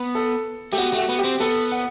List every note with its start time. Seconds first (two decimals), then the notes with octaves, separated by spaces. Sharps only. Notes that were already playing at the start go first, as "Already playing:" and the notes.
Already playing: B3
0.15 A4
0.72 A3 G4
0.78 B3 F#4
0.93 A3 F#4
1.09 B3
1.19 G4
1.24 C4
1.40 B3 A4
1.71 F#5